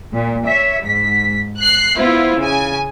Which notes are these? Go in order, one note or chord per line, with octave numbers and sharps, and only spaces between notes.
A#2
C#5 E5
G#2 B6
F#6 C7
B3 E4 F4 C5
C#3 G#5